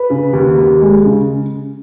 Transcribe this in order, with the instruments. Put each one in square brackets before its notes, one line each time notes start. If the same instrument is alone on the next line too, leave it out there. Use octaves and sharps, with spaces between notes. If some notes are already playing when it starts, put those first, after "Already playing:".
Already playing: [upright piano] B4
C#3
D#2
D#2
G#3
C#3